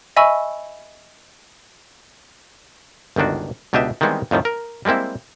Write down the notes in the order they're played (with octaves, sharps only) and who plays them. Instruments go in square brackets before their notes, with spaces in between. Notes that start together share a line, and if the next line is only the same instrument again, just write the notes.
[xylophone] D#5 E5 G#5 B5 C#6 E6
[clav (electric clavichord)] G1 C#2 D#3 D4 F#4
C#2 B2 D4 G4 D#5 E5
D#3 E3 G3 G#3 B3 C4
F2 A2 D#3 G3
A#4
G3 G#3 A#3 C4 E4